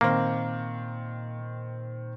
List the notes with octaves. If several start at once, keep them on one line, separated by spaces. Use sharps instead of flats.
A#2 D#3 A#3 C4